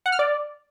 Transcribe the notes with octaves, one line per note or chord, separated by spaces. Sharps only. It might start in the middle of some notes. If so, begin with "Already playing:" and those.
F#5
F6
D5